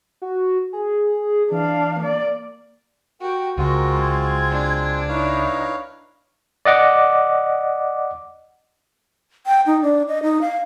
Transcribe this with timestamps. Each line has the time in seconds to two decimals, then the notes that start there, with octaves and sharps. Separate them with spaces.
0.22 F#4
0.73 G#4
1.51 E3 D4 F5
2.00 A#3 D5
3.21 F#4 G4 A#4 G5
3.58 C#2 G#3 C4 F4 F#4 A#4
4.00 G#6
4.51 D4
5.08 D#4 E4 B4 C#5 F5
6.65 D5 D#5 F#5 D6
9.47 G5
9.66 D#4
9.82 D4
10.08 D#5
10.23 D#4
10.41 F5